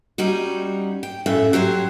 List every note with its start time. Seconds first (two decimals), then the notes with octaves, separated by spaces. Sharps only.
0.18 G3 C#4 D#4 F#4
1.03 G5
1.26 F#2 A2 C#3 A3 E5
1.53 F#3 G4 C5 C#5